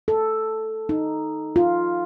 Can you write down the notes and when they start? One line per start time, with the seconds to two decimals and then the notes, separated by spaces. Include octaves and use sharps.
0.08 A4
0.89 D#4
1.56 F4